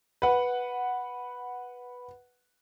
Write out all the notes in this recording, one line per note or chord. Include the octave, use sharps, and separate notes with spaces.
B4 F#5